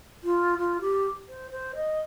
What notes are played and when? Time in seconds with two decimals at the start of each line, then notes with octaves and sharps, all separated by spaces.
0.23 F4
0.59 F4
0.81 G4
1.29 C5
1.52 C5
1.75 D#5